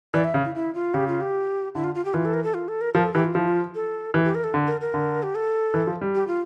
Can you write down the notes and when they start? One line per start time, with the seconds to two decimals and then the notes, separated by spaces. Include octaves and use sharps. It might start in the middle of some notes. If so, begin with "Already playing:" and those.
0.14 E3 D5
0.24 E5
0.34 C#3
0.45 E4
0.55 E4
0.75 F4
0.94 C#3 G4
1.08 F4
1.21 G4
1.75 D3 E4
1.84 F4
1.95 F4
2.05 G4
2.14 E3 F4
2.25 A4
2.34 A#4
2.44 A4
2.54 F4
2.68 A4
2.81 A#4
2.94 F3 A#4
3.04 A4
3.14 E3 G4
3.24 F4
3.34 F3 E4
3.48 F4
3.75 A4
4.14 E3 G4
4.24 G4
4.35 A#4
4.44 A4
4.54 D3
4.67 A#4
4.81 A#4
4.94 D3
5.23 G4
5.35 A4
5.74 E3
5.87 F3
6.01 G3
6.15 G4
6.27 F4